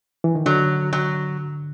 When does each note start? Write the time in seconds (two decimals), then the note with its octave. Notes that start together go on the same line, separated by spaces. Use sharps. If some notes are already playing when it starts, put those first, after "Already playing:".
0.24 E3
0.35 D#3
0.46 D3 F#3
0.93 F#3